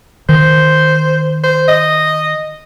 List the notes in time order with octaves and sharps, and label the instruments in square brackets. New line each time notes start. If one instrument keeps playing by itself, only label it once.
[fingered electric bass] D#3 [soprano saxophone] C5
[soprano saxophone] C5
D#5